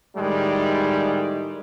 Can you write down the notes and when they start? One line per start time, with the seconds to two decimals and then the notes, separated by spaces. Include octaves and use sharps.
0.16 A2 D#3 G3 G#3